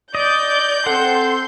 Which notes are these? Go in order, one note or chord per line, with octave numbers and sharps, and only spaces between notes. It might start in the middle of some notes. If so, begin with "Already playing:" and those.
D5 D#5 G6
C4 A4 F#5 C6